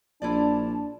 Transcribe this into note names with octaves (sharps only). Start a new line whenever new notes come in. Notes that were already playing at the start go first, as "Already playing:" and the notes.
A#1 D4 E4 F4 D5 A5